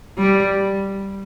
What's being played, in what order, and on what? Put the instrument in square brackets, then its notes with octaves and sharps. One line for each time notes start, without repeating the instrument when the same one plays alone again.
[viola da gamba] G3